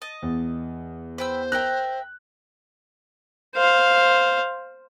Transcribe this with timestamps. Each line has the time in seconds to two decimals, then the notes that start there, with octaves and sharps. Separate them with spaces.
0.02 D#5 A5
0.22 E2
1.18 B4 C5 G5 E6
1.52 A#4 E5 G5 F#6
3.55 C5 F5